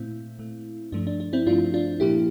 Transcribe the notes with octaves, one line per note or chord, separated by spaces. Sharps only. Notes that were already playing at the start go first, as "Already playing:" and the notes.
Already playing: A#2 A3 C4 E4
A#2 A3
G2 F3 A3 D4
D4
D4
C4 E4
G2 F3 A3 D4 F4
D4 F4
A#2 F3 A#3 E4 G4